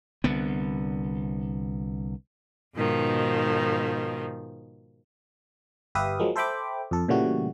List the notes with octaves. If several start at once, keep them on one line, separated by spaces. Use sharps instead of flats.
C2 D3 B3
G#2 B2 D#3 F3
G1 G4 B4 E5 F5 D#6
F3 F#3 G#3 A#3
A4 C5 E5 G5 B5 D6
F2 A4
A#2 C#3 E3 G3 A3 F#4